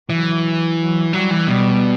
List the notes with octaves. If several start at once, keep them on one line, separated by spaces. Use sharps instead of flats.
E3 F#3
F#3
F#3 G3
E3
B2 G3